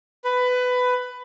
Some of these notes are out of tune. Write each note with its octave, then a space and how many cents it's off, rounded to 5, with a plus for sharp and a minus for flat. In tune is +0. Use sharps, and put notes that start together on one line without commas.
B4 +15